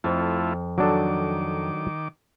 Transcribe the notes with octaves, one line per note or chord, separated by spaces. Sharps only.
F2 A3 E4 F4
D#3 F#3 D4 A4 D6